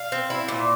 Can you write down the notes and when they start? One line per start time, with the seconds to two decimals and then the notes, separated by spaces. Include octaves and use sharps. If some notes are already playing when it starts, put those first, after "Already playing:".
Already playing: F5
0.12 C4
0.30 E4
0.48 A#2